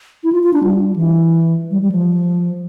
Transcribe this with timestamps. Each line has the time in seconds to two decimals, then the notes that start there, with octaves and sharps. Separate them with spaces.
0.24 E4
0.32 F4
0.43 F4
0.53 D4
0.64 G3
0.96 E3
1.71 G3
1.82 G3
1.92 F3